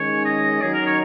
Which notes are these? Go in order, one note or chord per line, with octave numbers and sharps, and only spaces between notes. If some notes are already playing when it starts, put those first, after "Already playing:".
Already playing: D#3 G#3 C#4 C#5
D#5
D#3 F#3 D#4 G#4
A#4
C#5